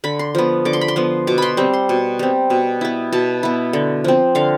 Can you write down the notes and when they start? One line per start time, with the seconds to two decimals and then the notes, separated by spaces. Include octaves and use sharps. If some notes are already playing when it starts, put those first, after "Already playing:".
0.04 D3 B5
0.19 C6
0.35 F3 B3
0.65 D3 D6
0.73 C6
0.81 B5
0.88 C6
0.96 F3 B3
1.27 B2 D6
1.38 B5 C6
1.57 G3 C4
1.73 C6
1.89 B2
2.19 G3 C4
2.50 B2
2.81 B3 E4
3.13 B2 A5
3.43 B3 E4
3.73 D3
4.04 F3 C4
4.35 D3 F5